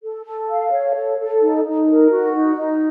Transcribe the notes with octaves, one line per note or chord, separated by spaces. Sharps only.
A4
A4
F5
C#5
A4
A4
D#4
D#4
A#4
F#4
D#4
D#4